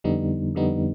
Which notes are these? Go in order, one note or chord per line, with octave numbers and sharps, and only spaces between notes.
F2 D3 G3 B3 D#4
F2 D3 G3 B3 D#4